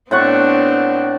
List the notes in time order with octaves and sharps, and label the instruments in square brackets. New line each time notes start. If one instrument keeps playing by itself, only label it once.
[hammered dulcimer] A2 F#5 C#6 [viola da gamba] B3 C4 D4